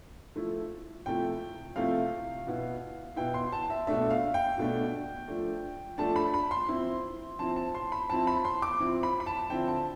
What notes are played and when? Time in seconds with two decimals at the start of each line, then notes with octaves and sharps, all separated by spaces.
0.36 F3 A3 E4
1.06 C3 F3 A3 E4 G5
1.76 C3 F3 A3 E4 F5
2.47 B2 B3 E4
3.16 B2 B3 E4 G5
3.34 C6
3.52 A5
3.70 E5
3.87 B2 A3 D4 E5
4.10 F5
4.34 G5
4.58 B2 A3 D4
5.27 F3 A3 D4
5.98 F3 A3 D4 A5
6.16 B5
6.34 B5
6.51 C6
6.69 F3 C4 E4
7.39 F3 C4 E4 A5
7.56 A5
7.75 C6
7.92 B5
8.10 F3 C4 E4 A5
8.27 B5
8.45 C6
8.62 D6
8.80 F3 C4 E4
9.03 B5
9.20 B5
9.26 A5
9.50 D3 F3 C4 E4 G5
9.68 A5